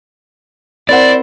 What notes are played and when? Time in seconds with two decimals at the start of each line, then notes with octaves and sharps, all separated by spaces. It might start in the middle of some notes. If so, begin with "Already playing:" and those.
0.89 C4 E4 A#4 C5 D5 F#5 A6